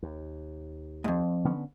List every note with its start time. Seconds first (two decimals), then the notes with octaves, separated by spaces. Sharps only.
0.03 D#2
1.04 F2 G#2
1.45 D3 B3 C#4